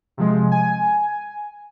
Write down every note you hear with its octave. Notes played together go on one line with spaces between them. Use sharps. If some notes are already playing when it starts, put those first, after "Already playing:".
C3 F3 G#3
G#5